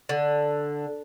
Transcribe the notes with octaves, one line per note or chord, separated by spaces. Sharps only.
D3